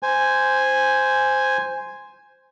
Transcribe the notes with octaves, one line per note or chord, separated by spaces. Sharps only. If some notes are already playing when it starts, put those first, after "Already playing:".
C5 G#5